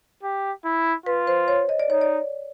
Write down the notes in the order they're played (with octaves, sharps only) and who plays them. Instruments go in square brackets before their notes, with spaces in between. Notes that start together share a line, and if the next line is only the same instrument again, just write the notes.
[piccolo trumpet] G4
E4
[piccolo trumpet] F4 [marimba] B4
[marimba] C5
C#5
D#5
D5
[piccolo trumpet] D#4 [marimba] C#5
[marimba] D5